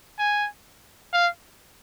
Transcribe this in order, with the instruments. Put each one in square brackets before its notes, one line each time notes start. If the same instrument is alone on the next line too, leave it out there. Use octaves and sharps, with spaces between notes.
[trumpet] G#5
F5